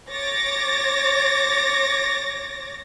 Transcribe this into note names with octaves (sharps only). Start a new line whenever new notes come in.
C#5 D6 A6 A#6